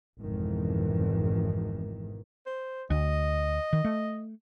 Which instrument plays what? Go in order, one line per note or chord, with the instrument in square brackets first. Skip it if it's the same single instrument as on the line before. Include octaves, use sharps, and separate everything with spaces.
[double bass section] G#1 F2 G#2 B2 D#3 E3
[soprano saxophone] C5
[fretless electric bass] D2 [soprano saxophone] D#5
[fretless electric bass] D#3
A3